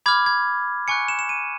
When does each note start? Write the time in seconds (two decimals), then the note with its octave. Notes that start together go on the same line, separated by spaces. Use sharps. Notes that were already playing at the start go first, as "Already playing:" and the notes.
0.06 B5 D6 F6 G#6
0.26 G#6
0.88 G#5 C#6 F#6 C#7
1.08 E7
1.19 E7
1.29 D#7